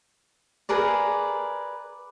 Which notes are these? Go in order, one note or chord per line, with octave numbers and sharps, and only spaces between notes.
G#4 A#4 B4 D5